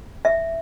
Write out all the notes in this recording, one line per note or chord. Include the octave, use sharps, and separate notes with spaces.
E5